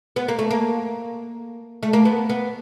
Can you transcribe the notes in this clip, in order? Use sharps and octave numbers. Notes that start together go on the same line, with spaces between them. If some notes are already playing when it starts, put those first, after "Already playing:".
B3
A#3
A3
A#3
A3
A#3
B3
B3